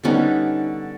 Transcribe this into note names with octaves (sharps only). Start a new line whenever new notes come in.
D3 G3 B3 C#4 D#4